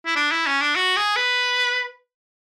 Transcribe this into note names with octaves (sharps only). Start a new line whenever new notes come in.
E4
D4
E4
C#4
D4
F#4
G#4
B4